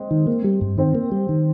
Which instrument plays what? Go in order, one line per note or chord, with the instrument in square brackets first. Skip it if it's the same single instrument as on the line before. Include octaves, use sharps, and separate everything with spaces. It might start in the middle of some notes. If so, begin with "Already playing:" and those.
Already playing: [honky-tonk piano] G#3 C4
[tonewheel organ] D#3
A#3
G3
G2
[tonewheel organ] D#3 [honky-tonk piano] C4
[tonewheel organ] A#3
G3
D#3